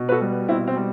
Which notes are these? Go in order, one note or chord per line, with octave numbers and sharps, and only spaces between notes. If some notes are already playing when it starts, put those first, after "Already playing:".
Already playing: B2
B4
F#4 A4
G3
B2 C4 E4
C4
G3